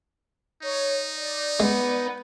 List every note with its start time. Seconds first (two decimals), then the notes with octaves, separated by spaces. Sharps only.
0.63 D#4 C#5
1.16 D5
1.60 G#3 B3 B4